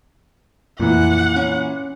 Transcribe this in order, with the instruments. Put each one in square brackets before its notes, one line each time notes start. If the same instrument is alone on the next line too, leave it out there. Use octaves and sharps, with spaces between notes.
[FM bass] F2 [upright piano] A#2 E3 [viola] F#5
[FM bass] C#4